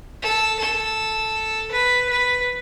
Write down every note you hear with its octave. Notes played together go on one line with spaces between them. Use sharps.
A4
A4
B4
B4